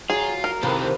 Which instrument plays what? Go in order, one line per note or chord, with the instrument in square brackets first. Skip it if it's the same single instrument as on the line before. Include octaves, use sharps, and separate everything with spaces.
[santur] F#3 [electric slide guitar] F4 [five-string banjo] G#4
[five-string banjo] A#4
[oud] C3 E3 [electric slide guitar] D#3 C4 A4 [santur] A#3 B4 D#5